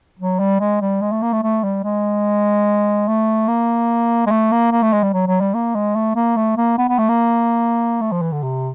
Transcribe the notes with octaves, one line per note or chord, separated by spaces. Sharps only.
F#3
G3
G#3
G3
G#3
A3
A#3
A3
A3
G3
G#3
A3
A#3
G#3
A3
A#3
A#3
A3
G#3
G3
F#3
F#3
G3
A#3
G#3
A3
A#3
A3
A#3
B3
B3
A3
A#3
A3
F3
E3
D3
C3